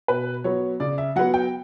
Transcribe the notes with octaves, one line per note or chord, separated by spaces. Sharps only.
B2 B4
F#3 B3 C#5
C#3 D5
E5
F#3 B3 F#5
G5